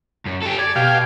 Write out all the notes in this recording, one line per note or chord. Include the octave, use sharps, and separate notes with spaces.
F#2
G4 A4
D5 G#6
B2 G4 F5